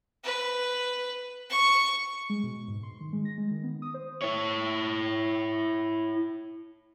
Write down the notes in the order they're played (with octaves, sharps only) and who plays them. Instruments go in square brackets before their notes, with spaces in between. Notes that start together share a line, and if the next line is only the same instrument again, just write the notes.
[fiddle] B4
C#6
[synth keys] G#3
B2
G#2
C6
D#3
G#3
A#6
G#3
D#3
B3
D#6
C5
[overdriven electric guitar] E4 C#5